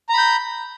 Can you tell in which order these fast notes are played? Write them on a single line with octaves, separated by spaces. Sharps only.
A#5 B5 G6